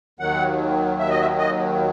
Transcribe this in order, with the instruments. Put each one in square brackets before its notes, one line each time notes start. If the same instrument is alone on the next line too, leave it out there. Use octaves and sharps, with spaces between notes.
[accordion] D#2 D#3 F#3 F#5
E5
D#5
E5
D#5